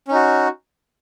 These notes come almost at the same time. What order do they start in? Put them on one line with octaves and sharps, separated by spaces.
C#4 D#4 F#4